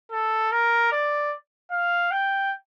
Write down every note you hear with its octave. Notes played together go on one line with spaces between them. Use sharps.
A4
A#4
D5
F5
G5